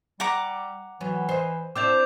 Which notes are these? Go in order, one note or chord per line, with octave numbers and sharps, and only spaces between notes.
G3 F#5 A#5 D6
E3 F#3 B3
C5 D#5
C4 D4 E4 D6 G6 F7